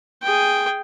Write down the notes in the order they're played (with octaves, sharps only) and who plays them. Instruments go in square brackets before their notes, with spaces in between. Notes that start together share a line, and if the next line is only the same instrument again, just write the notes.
[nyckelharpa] G#4 G5